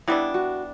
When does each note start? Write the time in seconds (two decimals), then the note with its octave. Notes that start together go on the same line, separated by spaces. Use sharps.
0.08 E3 G3 B3 D4 E4
0.34 F#4